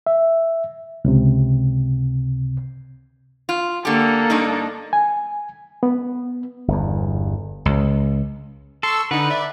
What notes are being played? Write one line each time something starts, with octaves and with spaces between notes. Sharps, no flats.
E5
C#2 C3
F4
D3 A#3 G4 A4
G2 D4 D#4
G#5
B3
G1 E2
C#2
A4 C6 C#6 E6
D3 D#4 B4 F#5
D5 E5